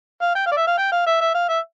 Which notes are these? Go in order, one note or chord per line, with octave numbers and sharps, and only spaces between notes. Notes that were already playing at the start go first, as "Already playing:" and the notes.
F5
G5
F5
D5
E5
F5
G5
F5
E5
E5
F5
E5